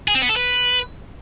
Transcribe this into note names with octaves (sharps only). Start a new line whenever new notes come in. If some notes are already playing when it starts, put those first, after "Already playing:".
G#4
C4
B3
A4
B4